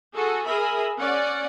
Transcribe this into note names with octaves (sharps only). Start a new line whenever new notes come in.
F#4 G#4 A4
G#4 A#4 E5 B5
C#4 D5 F#5